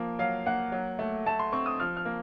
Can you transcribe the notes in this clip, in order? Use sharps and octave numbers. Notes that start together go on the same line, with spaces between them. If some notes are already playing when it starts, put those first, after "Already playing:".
Already playing: F3 A#3
F#3 F5
A#3 F#5
F#3
A3
A3 A5
C6
C4 C#6
D#6
F3 F6
F6
A#3